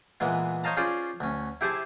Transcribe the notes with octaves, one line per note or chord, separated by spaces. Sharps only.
A#2 E3 G#3 B3
C5 C#5 D#5 F5 A5 A#5
C#4 F4 G#4 C5 D5
D2 C#4
E4 G4 G#4 C5 E5 A5